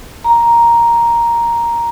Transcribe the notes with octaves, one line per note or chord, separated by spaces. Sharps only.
A#5